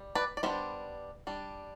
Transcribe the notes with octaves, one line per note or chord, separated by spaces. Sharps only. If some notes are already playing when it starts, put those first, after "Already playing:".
Already playing: G3
B4 D5
D5
G3 B3 D4 C5 E5
G3 D4